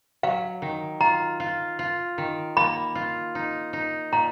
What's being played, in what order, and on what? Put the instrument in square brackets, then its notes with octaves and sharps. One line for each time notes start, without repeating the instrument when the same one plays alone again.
[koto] F#3 [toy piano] F5
[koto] D#3
[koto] F4 [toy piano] A#5
[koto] F4
F4
D#3
[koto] A#3 [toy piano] B5
[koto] F4
D#4
D#4
[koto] A#2 [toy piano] A#5